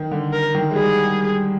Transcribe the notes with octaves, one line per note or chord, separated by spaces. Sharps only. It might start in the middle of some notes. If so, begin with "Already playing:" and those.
Already playing: D#3
D3
A#4
D#3
G#3
G3 G#4